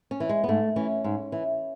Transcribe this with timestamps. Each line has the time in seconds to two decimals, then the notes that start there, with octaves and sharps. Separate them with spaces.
0.11 C#4
0.20 E3
0.29 G#3
0.44 B3
0.48 G#2 A3
0.76 E3 C#4
1.04 G#2
1.32 E3